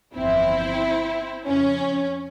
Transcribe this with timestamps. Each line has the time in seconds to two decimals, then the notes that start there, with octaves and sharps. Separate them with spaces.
0.15 G1 F2 E3 C4 E4
1.46 F2 C#3 F3 C#4